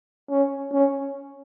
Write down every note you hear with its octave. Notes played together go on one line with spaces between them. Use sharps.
C#4
C#4